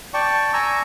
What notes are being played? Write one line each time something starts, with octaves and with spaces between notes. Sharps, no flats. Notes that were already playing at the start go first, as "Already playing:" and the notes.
D5 G5 A5 C#6
G#5 A#5 C#6 E6